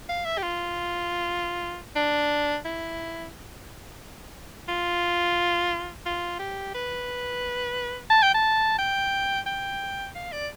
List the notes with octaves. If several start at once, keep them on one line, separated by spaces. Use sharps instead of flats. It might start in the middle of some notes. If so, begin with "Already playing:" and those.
F5
E5
G4
F4
D4
E4
F4
F4
G4
B4
A5
G5
A5
G5
G5
F5
D5